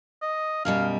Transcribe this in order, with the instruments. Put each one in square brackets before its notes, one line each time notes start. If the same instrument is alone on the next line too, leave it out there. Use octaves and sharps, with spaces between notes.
[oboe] D#5
[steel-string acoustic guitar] F#2 B2 G3 [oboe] F5